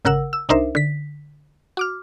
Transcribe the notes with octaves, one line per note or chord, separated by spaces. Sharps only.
G#1 C#3 A#4 F#5 E6
E6
C2 D4 D#4 A#4 C5 E5
D3 B6
F#4 D6 F6